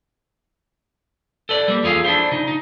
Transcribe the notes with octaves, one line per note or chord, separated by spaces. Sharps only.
A4 B4 D5
G3 A#3
E2 F4 G#4 A4 F5
D4 E4 C5
C#3 D#4
D#4